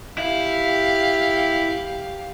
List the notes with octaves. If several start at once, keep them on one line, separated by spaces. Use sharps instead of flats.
E4 G4 F5